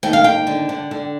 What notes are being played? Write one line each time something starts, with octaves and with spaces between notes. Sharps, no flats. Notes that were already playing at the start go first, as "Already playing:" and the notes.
D#2 G5
F5
D#2 G5
D3
D3
D3